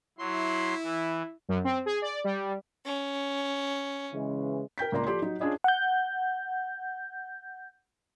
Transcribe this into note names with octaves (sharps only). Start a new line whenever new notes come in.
F#3 E4 C6
E3
F#2
C4
G#4
D5
G3
C#4
C#3 E3 G#3
A#4 G5 G6 B6
C#2 A#3 D5 A#5 C6
F3 G4 A4 D5 C6
F#3 D#4
C#4 D4 F4 G#4 D5 D#5
F#5 G6